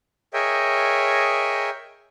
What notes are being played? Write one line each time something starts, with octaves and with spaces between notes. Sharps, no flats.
G#4 A#4 C#5 D#5 E5 G5